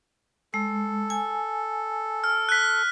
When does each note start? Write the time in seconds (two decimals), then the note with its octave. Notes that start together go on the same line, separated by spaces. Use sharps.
0.54 G#3 A4
1.10 G#5
2.24 F6
2.49 F#6 B6